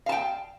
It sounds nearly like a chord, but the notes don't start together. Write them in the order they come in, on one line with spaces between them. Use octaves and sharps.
F5 A5 G5